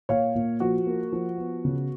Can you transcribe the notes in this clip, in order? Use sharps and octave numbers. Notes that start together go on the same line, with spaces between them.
A#2 C#5 F5
A#2
F3 F#4
A#3
F3
B3
C#3